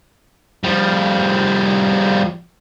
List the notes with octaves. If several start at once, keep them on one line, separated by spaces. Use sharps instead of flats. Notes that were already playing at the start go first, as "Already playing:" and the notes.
F3 G3